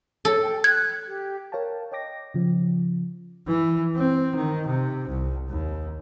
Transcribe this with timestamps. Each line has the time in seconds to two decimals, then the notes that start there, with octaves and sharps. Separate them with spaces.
0.25 A4 C#5
0.42 G5
0.64 F#6 G#6
1.06 G4
1.52 A#4 C#5 F5 G5 A5
1.92 C#5 D#5 G5 D6 A#6
2.34 C#3 F3
3.47 E3
3.96 C4
4.36 D#3
4.67 C3
5.09 C2
5.49 D#2